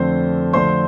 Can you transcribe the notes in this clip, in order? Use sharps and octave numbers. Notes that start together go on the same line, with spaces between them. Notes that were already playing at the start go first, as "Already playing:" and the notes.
Already playing: F2 D3 A3 C4 C5 C6
F2 D3 A3 C5 C6